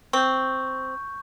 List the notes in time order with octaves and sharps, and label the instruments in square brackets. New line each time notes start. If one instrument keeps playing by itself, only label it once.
[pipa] C4 [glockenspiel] C#6 G6